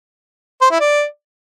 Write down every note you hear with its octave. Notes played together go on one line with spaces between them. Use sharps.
C5
E4
D5